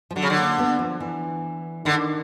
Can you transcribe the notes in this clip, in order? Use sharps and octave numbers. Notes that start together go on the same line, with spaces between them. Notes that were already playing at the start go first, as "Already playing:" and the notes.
F3
D3 F#3
C#3
D3
A#3
B3
F3
E3
D3 D#3